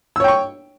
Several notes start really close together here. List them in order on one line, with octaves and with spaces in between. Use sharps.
E6 C#5 G5 C#6